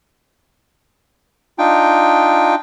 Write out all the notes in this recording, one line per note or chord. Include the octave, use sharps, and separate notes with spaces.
D4 D#4 F4 G5